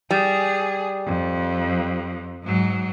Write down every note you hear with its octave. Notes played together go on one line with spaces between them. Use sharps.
G3 G#4
F2
G#2 F#3